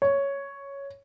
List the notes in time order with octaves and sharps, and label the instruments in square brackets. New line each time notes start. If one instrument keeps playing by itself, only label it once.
[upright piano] C#5